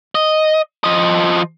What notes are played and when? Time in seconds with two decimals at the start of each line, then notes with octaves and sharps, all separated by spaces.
0.15 D#5
0.84 F3 D#5